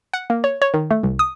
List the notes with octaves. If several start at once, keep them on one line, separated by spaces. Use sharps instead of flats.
F#5
A#3
C#5
C#5
D#3
A3
C2
D#6